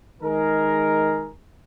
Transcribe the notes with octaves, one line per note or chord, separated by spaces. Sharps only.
D#3 G#3 D#4 G#4 A#4